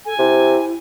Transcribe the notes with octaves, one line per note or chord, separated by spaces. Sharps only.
A4 G#5
C3 E4